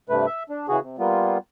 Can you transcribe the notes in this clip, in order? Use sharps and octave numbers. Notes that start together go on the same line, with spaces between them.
G2 C3 A3 B4
E5
D4
C#3 E3 F#4 G#4
C3
G3 A#3 B3 F4